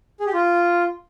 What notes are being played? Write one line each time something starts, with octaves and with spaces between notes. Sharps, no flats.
G#4
G4
F4